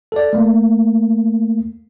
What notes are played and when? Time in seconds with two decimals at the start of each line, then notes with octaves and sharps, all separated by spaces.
0.12 A4 D5
0.33 A3 A#3